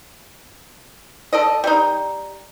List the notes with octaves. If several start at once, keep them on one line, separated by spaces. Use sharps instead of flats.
A4 D5 D#5
G3 D#4